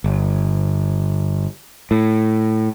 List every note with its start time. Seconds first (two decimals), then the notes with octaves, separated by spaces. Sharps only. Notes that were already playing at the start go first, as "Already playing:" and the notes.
0.04 G1
1.91 A2